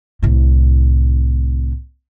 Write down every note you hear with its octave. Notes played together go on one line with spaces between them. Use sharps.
C2 A2